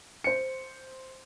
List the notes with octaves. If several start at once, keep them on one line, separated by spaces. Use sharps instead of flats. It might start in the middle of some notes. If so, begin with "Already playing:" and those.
C5 C#7